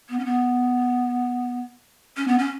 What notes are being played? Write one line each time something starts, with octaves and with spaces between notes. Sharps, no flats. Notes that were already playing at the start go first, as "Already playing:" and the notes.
B3
C#4
B3
C#4
B3
C#4